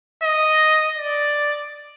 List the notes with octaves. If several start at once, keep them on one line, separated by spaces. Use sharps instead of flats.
D#5
D5